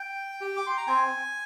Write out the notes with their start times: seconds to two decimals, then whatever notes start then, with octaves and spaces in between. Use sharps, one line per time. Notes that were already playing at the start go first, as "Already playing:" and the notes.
Already playing: G5
0.41 G4
0.57 D6
0.67 C6
0.77 A#5
0.87 C4 G#5